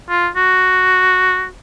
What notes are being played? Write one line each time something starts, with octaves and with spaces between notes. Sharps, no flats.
F4
F#4